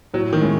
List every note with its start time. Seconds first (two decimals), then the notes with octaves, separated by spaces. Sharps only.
0.14 A2 F#3
0.33 D#3
0.41 G#3 C#4 E4